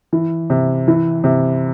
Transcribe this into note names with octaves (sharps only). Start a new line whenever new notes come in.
E3
C3
E3
C3